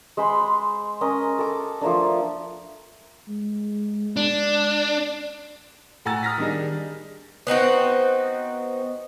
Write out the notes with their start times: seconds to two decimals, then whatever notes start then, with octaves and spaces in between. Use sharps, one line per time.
0.17 G#3 C5 B5
1.01 C#4 A#4 D#5
1.39 A4 D6
1.81 F3 A3 A#3 D4
3.29 G#3
4.16 D4
6.05 A2 F#5 G#5 A#5 E6 A6
6.23 D#6 F6 A#6 B6
6.38 D#3 G3 D4 D#4 G#4
7.47 B3 C4 D#4 F#4